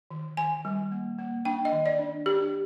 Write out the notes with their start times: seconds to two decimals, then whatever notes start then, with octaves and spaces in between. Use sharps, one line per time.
0.10 D#3
0.37 D#3 G#5
0.65 G3
0.92 A#3
1.19 A#3
1.45 D4 G5
1.65 D#5
1.72 D#3
1.86 D5
1.99 D4
2.26 D4 G4